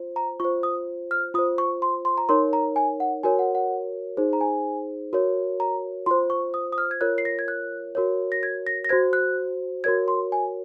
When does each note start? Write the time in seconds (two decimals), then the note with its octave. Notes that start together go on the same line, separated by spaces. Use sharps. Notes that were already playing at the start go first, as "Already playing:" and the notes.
Already playing: F4 C5
0.16 A#5
0.40 F4 C5 C#6
0.63 D#6
1.11 F6
1.34 F4 D#6
1.39 C5
1.58 C#6
1.82 C6
2.05 C6
2.18 A#5
2.29 D#4 A#4 C#5 C6
2.53 A#5
2.76 G#5
3.00 F#5
3.23 F#4 A#4 C#5 G#5
3.39 F#5
3.55 F#5
4.17 D#4 G#4 C5
4.33 A#5
4.41 G#5
5.13 F#4 A#4 C#5
5.60 A#5
6.06 F4 C5 C6
6.30 C#6
6.54 D#6
6.73 D#6
6.78 F6
6.91 G#6
7.01 F4 A#4 C#5 F#6
7.18 C7
7.25 A#6
7.39 G#6
7.48 F#6
7.95 F#4 A#4 C#5
8.32 A#6
8.43 G#6
8.67 A#6
8.85 A#6
8.89 F#4 C5 G#6
9.13 F#6
9.84 F#4 A#4 C#5 G#6
10.08 C6
10.32 G#5